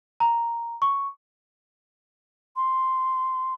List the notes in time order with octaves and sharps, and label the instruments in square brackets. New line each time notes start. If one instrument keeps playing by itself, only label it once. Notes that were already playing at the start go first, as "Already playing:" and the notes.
[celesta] A#5
C#6
[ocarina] C6